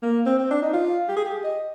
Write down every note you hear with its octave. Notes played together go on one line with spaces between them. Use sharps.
A#3
C4
C4
D4
D#4
F4
G4
G#4
G4
D#5